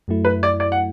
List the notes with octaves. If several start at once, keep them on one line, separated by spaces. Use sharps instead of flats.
F#2 F#3 A3 E4
B4
D5
D5
F#5